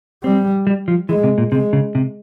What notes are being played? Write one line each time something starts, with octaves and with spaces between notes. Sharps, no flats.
G3 C4
G3
F3
E3 G#3
C3
A#2
C3 G#3
C#3
C3